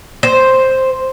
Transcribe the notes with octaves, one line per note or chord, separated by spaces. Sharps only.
C5